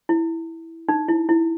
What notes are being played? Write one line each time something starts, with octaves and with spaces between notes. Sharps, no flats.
E4
D#4
E4
E4